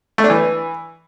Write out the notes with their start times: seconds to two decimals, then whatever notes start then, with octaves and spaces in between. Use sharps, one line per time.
0.18 A3
0.24 D4
0.30 E3